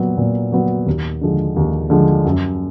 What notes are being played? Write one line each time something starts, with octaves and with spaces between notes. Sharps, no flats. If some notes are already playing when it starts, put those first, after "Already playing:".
Already playing: A#2 F#3 B3
A#2
F#3 B3
D#2
D3 F3 G#3
D#2
D3 F3 G#3
F#2